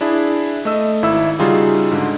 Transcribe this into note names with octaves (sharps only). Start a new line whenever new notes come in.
D4 E4 G#4
A3 D#5 E6
G#1 E4 E5 E6
C#3 G3 D#4 F4 F#4 G#4
G#2 D3